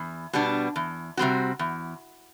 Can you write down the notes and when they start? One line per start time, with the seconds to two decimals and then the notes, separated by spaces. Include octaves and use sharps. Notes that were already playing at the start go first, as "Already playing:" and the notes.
Already playing: E2
0.33 B2 G3 B3 D4
0.76 E2
1.17 C3 G3 C4 F#4
1.59 E2